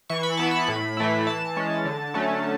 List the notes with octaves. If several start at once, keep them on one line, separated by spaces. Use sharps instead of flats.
E3 C#6
B5
B3 E4 A5
B5
A2
E3 A3 E4
E3 A5
G#3 C#4
D3
F#3 A3 C#4